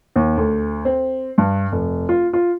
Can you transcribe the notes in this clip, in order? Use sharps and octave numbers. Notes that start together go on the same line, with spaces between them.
D#2
D2
C4
G2
F1
F4
F4